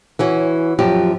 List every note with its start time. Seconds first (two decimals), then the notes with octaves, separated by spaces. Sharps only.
0.19 E3 C#4 F#4
0.79 F#2 F3 G4